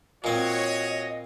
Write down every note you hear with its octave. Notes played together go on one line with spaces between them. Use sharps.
A#2 C4 F#4 C#5 D#5